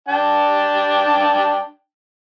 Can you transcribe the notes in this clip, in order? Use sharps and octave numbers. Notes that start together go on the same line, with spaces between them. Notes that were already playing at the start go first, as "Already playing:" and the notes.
D4 G5 A5